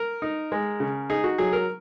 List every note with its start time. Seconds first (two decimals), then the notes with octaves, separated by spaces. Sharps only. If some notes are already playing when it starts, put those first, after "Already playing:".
Already playing: A#4
0.22 D#4
0.52 G#3
0.80 C#3
1.10 D#4 G#4
1.24 F#4
1.38 F#3 G#4
1.53 A#4